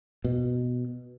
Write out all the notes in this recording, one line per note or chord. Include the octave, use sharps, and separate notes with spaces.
B2